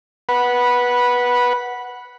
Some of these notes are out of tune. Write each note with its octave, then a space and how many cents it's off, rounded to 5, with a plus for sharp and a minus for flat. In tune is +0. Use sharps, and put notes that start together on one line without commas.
B4 -15 F#5 +0 B5 -10